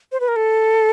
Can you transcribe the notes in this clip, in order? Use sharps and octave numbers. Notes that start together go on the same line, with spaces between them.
C5
B4
A#4
A4